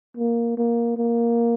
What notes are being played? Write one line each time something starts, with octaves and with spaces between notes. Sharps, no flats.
A#3
A#3
A#3